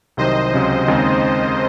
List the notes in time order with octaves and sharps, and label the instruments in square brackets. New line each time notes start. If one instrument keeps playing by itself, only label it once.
[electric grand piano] C2 C3 D#3 F#3 [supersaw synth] C5 D#5
[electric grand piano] C#2 C3 F#3 C#4
D#2 C#3 G#3 C4 D#4